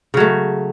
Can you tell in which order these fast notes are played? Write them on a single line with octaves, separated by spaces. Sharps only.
C#3 F#3 A3